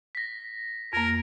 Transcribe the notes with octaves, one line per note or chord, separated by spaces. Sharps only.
A#6 B6
F2 A#3 A#4